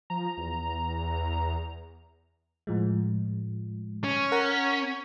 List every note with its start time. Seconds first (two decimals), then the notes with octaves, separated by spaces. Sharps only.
0.10 F3 A#5
0.37 E2
2.67 A2 F3 G#3
4.04 C#4
4.32 A#4 F#5 A#5